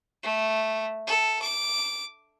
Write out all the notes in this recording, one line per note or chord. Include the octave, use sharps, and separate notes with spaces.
A3
A4
D6